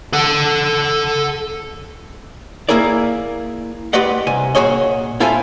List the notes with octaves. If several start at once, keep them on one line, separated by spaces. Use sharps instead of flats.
A4 F#5
A#3 E4 G#4 A#4 D5
G#3 G4 B4 D5 D#5 F#5
C2 G#5
A#2 F#4 G#4 C#5 D#5
E4 F4 A4 C5 E5 G#5